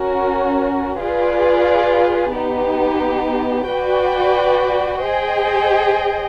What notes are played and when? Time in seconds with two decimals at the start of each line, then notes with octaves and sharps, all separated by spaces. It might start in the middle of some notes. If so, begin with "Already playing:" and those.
Already playing: C#4 F#4 A#4
1.01 F4 G#4 B4 D5
2.34 B3 D#4 G4
3.68 F#4 B4 D5 G5
5.03 G#4 C5 D#5 G5